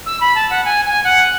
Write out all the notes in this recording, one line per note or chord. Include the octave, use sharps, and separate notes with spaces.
E6
B5
A5
F#5
G#5
G#5
F#5